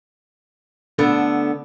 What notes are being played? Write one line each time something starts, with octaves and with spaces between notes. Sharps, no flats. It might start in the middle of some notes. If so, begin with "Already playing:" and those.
D3 A3 B3